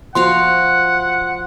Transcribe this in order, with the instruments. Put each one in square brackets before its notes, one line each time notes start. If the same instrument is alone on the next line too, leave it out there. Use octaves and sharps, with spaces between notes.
[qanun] F3 F#4 F5 [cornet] F#5 [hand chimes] C6